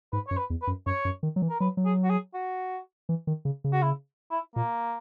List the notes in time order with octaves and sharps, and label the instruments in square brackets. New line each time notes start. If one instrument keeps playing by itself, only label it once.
[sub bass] G#2 [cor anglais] B4
[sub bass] F#2 [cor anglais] C#5
[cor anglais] B4
[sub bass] E2
[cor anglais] B4
[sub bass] F#2
[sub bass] F#2 [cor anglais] C#5
[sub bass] F#2
D#3
F#3
E3
[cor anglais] A#4
[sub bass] F#3 [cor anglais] B4
[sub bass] F#3
[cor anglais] G#4
F#4
G#4
F#4
[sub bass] E3
D#3
C#3
C#3
[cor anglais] F#4
E4
E4
[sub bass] A#2 [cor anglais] A#3